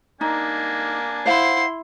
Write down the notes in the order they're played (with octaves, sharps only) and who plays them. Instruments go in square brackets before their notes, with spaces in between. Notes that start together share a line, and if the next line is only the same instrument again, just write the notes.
[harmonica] A#3 D4 G#5 [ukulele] D#4
[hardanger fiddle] E4 C6 [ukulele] C5 F5 F#5 [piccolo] C7